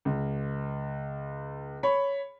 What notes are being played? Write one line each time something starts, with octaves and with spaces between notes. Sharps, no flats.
C#2
C#5 B5